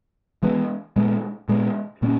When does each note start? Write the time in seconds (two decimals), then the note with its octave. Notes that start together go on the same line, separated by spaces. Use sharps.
0.43 E3 G#3 B3
0.96 A#2 G#3 B3
1.49 A#2 G#3 B3
2.02 A#2 A#3 C#4